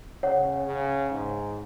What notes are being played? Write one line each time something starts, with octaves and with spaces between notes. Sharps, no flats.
C#3 C#5 F#5
C#3
G#2